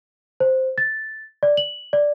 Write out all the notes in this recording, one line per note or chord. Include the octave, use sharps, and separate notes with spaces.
C5
A6
D5
F#7
D5